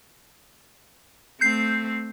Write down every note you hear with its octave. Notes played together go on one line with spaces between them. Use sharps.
A3 C4 G6 C7